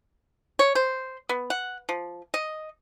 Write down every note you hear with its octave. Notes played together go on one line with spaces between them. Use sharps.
C#5
C5
B3
F#5
F3
D#5